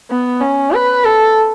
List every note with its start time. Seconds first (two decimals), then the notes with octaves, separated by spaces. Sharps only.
0.10 B3
0.41 C#4
0.73 B4
1.04 A4